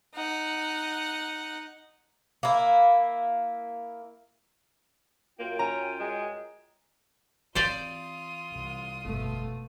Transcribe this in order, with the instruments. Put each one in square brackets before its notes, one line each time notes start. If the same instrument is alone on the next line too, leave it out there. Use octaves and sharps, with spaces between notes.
[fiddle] D#4 F#5
[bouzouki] A#3 E4
[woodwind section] F#2 F4 G5 [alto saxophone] A#3
[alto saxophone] C#4 [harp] A#5
[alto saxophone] G#3
[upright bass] E3 C4 [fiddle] F4 D#6 [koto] G4 C5 D5
[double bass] C2
[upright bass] G1 F2 [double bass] B2 A3